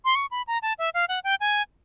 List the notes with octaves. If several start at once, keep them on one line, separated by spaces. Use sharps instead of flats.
C6
C#6
B5
A#5
A5
E5
F5
F#5
G5
G#5